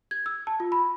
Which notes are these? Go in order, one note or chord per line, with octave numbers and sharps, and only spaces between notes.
G#6
E6
A5
F4
B5